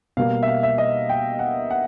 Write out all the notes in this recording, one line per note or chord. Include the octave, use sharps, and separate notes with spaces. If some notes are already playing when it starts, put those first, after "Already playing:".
B2 G3 A#3 F5
E5
F5
E5
D#5
G5
F#5
F#5